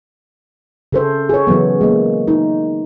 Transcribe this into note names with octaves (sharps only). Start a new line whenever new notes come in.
C#3 A4 C5
G#4 C#5
C#3 E3 F#3 B3
G#3 A#3
D#4